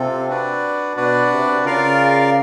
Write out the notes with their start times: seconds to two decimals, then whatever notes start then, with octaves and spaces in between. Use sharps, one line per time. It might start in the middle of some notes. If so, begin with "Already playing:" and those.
Already playing: C3 C4 F4 A4
0.28 D4 F#4 B4 D5
0.96 B2 D4 F#4 B4 D5
1.31 C3
1.65 C#3 F4 A#4 D5 F5